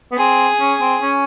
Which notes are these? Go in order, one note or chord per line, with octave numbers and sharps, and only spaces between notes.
B3
C4 G#4
C#4
C4
C#4